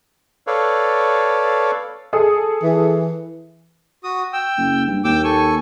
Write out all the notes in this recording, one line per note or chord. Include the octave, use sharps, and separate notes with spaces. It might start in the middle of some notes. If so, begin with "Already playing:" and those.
A4 B4 C#5 D5 F5
G#4 A4 D#6
E3
F#4 D#6
G5 E6
F#1
G2
D#2 G5 D6 E6
A4 G#5 C#6